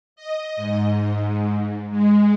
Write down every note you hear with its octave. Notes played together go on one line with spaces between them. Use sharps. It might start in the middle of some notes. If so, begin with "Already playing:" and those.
D#5
G#2
G#3